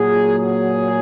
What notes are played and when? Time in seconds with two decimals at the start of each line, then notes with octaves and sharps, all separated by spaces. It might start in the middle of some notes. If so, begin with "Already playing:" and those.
Already playing: A#2 F#3 G#4
0.39 G#4